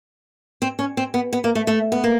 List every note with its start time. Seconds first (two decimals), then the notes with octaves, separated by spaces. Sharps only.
0.62 C4
0.79 C#4
0.97 C4
1.14 B3
1.33 B3
1.44 A#3
1.55 A3
1.67 A3
1.92 B3
2.04 A#3